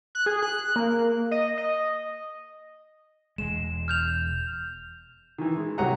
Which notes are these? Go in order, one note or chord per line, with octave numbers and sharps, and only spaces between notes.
F#6
G#4
F#6
A#3
D#5
D#5
E1 G#3 E7
F6 G6 F7
D#3 E3
G#3
C2 F#3 F#4 G4 F#5 A#5